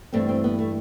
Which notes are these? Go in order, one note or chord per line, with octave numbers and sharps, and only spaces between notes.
G2 E3 A3 C4
C4
B3
A3